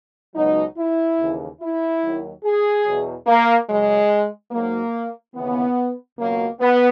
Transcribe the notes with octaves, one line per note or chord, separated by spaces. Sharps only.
C#2 B2 F#3 D#4
E4
D#2 C#3 E3
E4
D#2 D#3 F#3
G#4
E2 B2 F#3
A#3
F#2 C#3 F#3 G#3
G#2 F#3 A#3
D#2 C#3 E3 B3
C#2 B2 F#3 A#3
B3